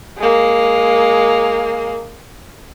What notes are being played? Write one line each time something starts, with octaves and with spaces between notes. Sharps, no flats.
G#3 A#3